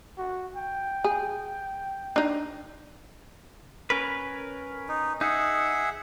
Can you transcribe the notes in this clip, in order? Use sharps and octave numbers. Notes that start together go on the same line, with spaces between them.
F#4
G5
G#4
D4 D#4
C#4 A#4 B4
D#4
D#4 G#4 E5 F#5